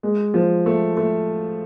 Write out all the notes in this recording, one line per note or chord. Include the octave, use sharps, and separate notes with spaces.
G#3
F3
A3
A3